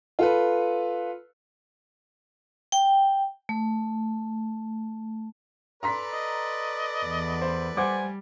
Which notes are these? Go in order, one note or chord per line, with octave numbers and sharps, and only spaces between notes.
F4 A4 B4
G5
A3
A4 B4 D5 A#5 C6 B6
D#5
E2
C5
G3 C5 F#5 G#5 D6